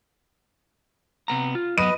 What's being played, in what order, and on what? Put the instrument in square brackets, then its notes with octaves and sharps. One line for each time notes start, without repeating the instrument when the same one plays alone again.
[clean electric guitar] C3 B3 A#5
F4
[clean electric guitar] F#3 B3 [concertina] B4 D#5 [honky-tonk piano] D#7